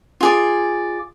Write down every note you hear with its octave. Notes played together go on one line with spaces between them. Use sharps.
F4 G#4 D5